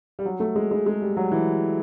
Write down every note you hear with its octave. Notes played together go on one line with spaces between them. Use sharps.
G3
F#3
A3
G#3
G#3
G#3
G3
F#3
E3